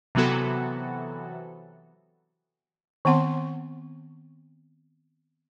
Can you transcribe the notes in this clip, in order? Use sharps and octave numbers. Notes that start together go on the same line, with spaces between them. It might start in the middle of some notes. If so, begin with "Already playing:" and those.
C3 E3 F#3 B3 F#4 A4
D#3 B3 C4 F#5 C6